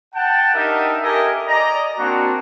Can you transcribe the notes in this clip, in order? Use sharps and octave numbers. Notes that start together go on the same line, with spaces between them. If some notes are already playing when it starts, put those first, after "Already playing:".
F#5 G5 A5
D4 D#4 G4 A#4 D#5 E5
G4 A4 A#4 D#5 E5 G#5
D5 D#5 A#5
A#3 C4 D4 F#4